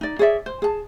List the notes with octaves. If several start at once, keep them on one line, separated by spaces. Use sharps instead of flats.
D#4 D5
G#4 C#5 D5 E5
C5
G#4 A5